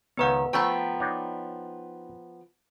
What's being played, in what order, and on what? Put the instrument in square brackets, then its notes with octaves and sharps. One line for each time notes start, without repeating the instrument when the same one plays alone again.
[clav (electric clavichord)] C#2 D#3 C#5 [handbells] B3 B4 F#5
[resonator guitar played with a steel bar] F3 B3 G5 [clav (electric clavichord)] A3 [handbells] A#5 B5
[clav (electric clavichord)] D4 D#4 C#5